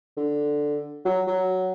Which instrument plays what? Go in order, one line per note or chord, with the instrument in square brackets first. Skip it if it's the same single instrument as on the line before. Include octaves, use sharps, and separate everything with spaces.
[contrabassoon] D3
F#3
F#3